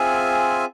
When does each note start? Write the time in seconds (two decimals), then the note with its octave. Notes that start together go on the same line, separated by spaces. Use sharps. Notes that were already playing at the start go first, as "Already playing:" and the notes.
Already playing: C4 F4 G#4 E5 G#5